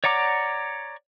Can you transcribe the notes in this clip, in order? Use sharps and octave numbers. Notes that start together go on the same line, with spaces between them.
C#5 D5 F#5 A#5 D6